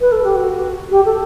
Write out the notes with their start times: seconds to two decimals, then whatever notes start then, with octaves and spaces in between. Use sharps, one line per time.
0.01 B4
0.12 A4
0.23 G4
0.35 F#4
0.91 G4
1.05 A4